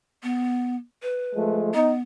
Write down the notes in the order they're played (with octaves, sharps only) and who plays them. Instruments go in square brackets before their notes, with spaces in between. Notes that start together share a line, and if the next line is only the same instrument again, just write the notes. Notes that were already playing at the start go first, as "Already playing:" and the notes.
[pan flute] B3
B4
[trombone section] F3 G#3 A3
[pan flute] B3 [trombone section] D#4